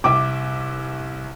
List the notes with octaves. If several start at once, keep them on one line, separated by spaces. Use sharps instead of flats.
C2 E5 D6